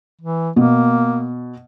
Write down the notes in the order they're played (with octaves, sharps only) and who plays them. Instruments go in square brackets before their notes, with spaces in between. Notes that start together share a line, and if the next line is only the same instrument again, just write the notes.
[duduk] E3
[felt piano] B2 [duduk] A#3